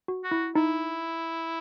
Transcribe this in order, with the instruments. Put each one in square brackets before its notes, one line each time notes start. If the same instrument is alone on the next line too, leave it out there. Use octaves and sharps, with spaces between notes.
[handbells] F#4
[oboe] F#4
[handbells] E4
[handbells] D#4 [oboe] E4